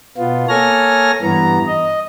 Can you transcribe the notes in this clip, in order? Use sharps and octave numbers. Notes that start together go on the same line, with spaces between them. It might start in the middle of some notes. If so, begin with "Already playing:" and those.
B2 B3 F4
A#3 A4 C#5 G#5 F6 A#6
G2 E3 B3 A#5
D#5